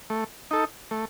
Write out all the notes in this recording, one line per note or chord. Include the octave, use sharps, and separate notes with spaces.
A3
D#4 A4
A3